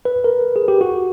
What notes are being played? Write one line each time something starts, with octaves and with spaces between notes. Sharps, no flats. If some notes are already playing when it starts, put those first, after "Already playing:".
B4
A#4
G#4
G4
F#4